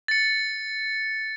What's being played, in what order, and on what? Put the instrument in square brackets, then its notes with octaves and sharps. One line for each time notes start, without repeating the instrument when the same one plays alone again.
[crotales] A6 C#7